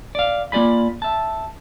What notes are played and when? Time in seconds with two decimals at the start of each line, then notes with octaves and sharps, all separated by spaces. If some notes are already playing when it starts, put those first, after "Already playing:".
0.15 D5 F5
0.52 A#3 F4 D5 G#5 B5
1.02 E5 A5